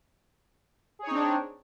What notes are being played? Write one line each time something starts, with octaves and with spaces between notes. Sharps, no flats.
C4 D4 D#4 G#4 C#5